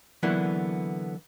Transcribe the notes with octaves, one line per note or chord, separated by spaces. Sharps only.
D3 E3 F#3 A#3 B3 E4